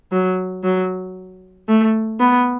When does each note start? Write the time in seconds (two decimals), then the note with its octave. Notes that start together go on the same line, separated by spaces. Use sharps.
0.12 F#3
0.64 F#3
1.68 A3
2.20 B3